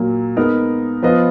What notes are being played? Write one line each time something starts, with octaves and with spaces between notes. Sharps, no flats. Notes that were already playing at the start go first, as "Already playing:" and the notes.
Already playing: A#2 F#3 A#3
G#3 B3 D#4 A#4
F3 B3 F4 B4 D#5